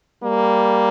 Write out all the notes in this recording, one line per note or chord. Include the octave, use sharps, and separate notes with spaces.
G3 A#3